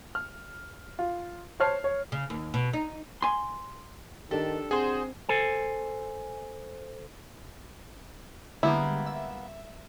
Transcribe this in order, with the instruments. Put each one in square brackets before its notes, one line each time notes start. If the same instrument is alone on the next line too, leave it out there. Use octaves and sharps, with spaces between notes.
[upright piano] F6
F4
C5 C#5 A5 F6 C7
C#5
[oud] C#3
D#2
B2
D#4
[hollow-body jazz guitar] G#5 C6
[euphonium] D#3 [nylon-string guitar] D4 G4 [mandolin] A4
[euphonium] C4 [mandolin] F#4 C5 [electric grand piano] G#4
[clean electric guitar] A4 C5 G#5
[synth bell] D3 G3 G#3 [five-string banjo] A#3 B3 E4
[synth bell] E5